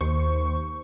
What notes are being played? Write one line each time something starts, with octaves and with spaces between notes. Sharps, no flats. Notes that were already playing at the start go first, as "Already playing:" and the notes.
D#2 C5 C#6